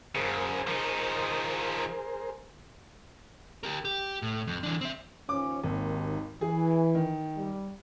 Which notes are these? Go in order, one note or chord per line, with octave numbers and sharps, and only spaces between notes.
F#2 C#3 G#4 A#4 C5
F3 D#4
G4 A#4
G4
A2
F2
E3 D4
C4 E5
D#2 F3 C#4 D6
G#1 D#2
E3 G#4
D#3
G3